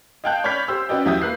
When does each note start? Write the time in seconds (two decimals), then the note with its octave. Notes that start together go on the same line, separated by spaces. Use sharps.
0.24 D#5 F5 G5 A5 F#6 G6
0.44 C#5 D5 B5 F6 G6 B6
0.68 G4 C5 E6
0.89 C#4 F#4 B4 D5 D#5 G5
1.05 E2 F#3 G4 E5 D#6 G6
1.22 A#3 B4 F#6 C7